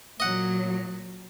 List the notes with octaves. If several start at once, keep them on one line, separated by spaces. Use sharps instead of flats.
A#2 F#3 D#5 F#5